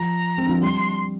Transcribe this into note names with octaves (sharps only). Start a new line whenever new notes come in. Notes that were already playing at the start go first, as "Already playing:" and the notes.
Already playing: F3 A#5
C4
D3
F3
G3 C6